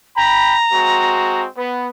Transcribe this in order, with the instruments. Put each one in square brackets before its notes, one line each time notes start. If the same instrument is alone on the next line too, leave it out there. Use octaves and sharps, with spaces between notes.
[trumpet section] G5 B5 [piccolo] A#5
[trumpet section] G#3 C4 F#4
B3